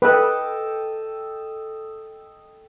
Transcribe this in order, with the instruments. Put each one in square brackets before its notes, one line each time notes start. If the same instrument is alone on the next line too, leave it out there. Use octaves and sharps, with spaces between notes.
[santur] A4 D#5 G5 [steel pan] B4